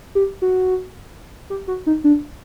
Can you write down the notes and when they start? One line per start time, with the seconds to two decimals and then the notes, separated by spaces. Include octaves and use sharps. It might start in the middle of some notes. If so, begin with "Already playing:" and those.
0.15 G4
0.42 F#4
1.50 G4
1.68 F#4
1.87 D#4
2.04 D4